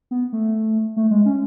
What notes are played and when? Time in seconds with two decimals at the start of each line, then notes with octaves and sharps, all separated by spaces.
0.11 B3
0.33 A3
0.96 A3
1.11 G#3
1.25 C#4